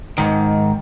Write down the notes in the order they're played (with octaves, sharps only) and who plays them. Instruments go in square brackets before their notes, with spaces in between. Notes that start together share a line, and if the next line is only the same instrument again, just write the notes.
[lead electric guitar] G#2 D#3